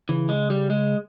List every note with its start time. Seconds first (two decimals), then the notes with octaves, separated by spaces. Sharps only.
0.09 C#3 E3
0.29 G#3
0.50 G3
0.70 G#3